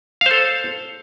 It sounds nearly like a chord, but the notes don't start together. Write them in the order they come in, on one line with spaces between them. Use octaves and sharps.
F5 C5 A4